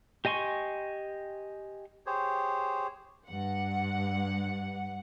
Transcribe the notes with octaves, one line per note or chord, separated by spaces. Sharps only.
G4 D#5 G#5 C6 C#6
G4 G#4 C5 C#5
G2 F#5